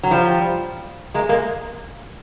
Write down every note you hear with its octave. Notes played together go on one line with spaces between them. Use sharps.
F#3
F3 G3
G#3 A#3
G#3 A#3